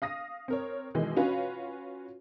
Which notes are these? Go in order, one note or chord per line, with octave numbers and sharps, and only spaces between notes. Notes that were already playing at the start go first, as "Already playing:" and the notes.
F5 D#6 A#6
C4 A#4 C#5
B2 D#3 E3 G#3
C#4 F4 F#4 B4 C#5